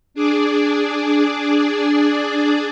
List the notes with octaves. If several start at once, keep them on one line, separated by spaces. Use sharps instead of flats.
D4 G#4 D5